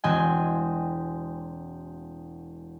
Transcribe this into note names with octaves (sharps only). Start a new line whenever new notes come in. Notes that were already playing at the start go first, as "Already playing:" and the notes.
E1 C4 F#4 D#5 G5 G#5